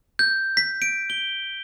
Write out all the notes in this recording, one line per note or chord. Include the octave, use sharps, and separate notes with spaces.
G6
B6
D7
G7